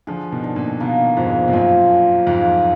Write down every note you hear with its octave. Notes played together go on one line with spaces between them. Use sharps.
D3 F3 G#4
B2 D#3
D4
A#2 D3
B2 D#3 A#3
F2 G#2 F3
B2
F#2 A#2 F4
D4
F2 G#2 F4